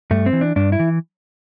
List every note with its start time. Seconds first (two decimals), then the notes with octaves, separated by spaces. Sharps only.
0.11 G2 A3
0.26 C4
0.33 E3
0.41 D4
0.56 G2 D4
0.72 E4
0.80 E3